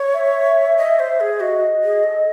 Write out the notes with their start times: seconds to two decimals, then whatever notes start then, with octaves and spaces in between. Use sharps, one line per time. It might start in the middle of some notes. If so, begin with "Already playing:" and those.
Already playing: C#5
0.14 E5
0.77 D#5
0.99 C5
1.20 G#4
1.40 F#4 D#5
1.84 G#4
2.04 A4